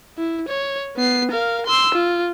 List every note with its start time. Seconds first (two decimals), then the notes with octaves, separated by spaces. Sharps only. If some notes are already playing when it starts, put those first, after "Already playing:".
0.18 E4
0.48 C#5
0.97 B3 C7
1.31 A#4 F5
1.66 C6 E6
1.95 F4